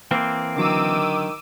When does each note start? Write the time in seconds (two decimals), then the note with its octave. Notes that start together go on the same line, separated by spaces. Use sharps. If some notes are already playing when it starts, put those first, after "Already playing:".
0.11 E3 A#3 C4
0.56 D3 D#3 F#3 D6 E6 D#7